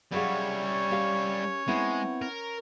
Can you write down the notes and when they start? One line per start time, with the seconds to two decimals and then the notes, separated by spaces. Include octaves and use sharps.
0.12 F#3 G3 C#4 E4 G#4 C#5 F5
0.91 G4 A#4 F5
1.68 G#3 B3 C4 E4
2.22 A#4